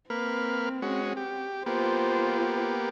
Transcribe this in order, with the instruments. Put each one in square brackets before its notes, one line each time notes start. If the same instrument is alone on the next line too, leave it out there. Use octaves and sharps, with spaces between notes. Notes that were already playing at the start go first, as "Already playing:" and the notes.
[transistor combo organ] A#3 B4 F6 [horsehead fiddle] C4
[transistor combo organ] G#3 C#4 F#4
G4
[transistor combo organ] A#3 B3 G4 [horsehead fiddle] F4 C5